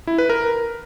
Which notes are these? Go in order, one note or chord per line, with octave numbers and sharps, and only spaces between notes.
E4
B4
A#4